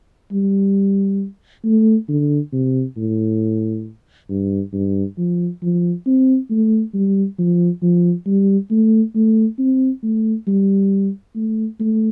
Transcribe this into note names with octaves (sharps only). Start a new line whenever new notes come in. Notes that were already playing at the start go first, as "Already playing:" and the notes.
G3
A3
D3
C3
A2
G2
G2
F3
F3
C4
A3
G3
F3
F3
G3
A3
A3
C4
A3
G3
A3
A3